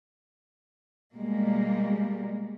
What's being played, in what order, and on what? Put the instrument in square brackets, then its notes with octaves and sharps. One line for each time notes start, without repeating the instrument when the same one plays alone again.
[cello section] B2 G3 G#3 A#3